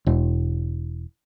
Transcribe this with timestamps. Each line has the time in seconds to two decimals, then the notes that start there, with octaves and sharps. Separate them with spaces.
0.07 E1